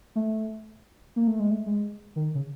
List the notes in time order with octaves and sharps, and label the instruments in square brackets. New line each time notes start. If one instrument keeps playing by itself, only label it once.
[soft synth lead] A3
A#3
A3
G#3
A3
G#3
D#3
C#3